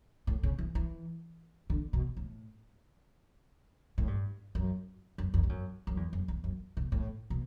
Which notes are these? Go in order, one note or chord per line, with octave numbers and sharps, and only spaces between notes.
A2
C#3
E3
E3
D3
B2
A2
A2
G2
F#2
F#2
E2
G2
F#2
F#2
E2
F#2
E2
F#2
B2
A2
B2